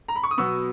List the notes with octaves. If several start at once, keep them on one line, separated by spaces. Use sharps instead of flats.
A#5
B5
C#6
D#6
B2 F#3 B3 C#6 E6